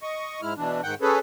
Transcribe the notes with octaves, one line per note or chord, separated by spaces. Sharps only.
D#5 C#6
G#2 G#3 E4 F6
B2 E3 D4
G#2 D#3 F#5 G5
C#4 G#4 A4 B4